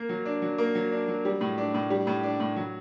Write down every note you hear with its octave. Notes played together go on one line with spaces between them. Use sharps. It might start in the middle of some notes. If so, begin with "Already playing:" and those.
Already playing: A#3
F#3
D4
F#3
A#3
F#3
D4
F#3
G3
A2
D4
A2
G3
A2
D4
A2
F#3